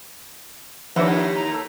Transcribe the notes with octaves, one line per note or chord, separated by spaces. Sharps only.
D#2 F3 D4 B4 E5 F#5
E4
A#5
A4